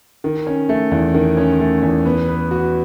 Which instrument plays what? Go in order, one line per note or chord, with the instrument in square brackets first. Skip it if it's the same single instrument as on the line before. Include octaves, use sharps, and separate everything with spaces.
[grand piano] D#3
C#4
A3
E2
D#3
C#4
A3
E2
B3
B4
F#4